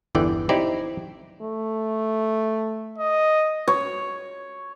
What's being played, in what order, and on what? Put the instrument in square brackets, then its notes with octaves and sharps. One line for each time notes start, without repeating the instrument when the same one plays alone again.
[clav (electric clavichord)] G1 E2 D3 E3 D5 G5
C4 D#4 E4 G4 C5 D5
[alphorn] A3
[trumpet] D#5
[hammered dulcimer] C#5